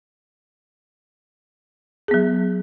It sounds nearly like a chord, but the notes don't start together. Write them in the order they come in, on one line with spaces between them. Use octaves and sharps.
G#4 B3 F#3